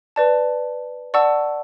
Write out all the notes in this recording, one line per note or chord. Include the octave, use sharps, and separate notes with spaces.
B4 D5 A5
D5 F#5 A5 C#6 E6